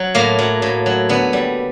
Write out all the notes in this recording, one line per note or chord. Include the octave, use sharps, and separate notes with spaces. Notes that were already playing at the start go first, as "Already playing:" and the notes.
Already playing: F#3
A2 A#3
F#3
A2
F#3
D3 B3
G3